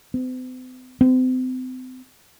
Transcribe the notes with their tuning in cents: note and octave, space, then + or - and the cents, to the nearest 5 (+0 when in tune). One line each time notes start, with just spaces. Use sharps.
C4 -45
C4 -35